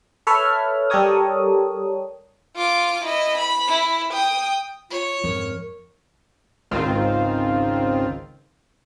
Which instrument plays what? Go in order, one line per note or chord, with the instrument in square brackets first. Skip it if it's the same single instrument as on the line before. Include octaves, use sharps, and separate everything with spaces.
[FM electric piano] A4 B4 C#5 E5 F6
G3 G4 A4 A#4 C#5 D#6
[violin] F4 D6
E4 D#5
B5
E4
G5 D#6
[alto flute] F4 [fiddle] C#5
[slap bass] F2 G#2 F3 [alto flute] A#4
[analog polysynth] G#1 C#2 D#3 C4 F4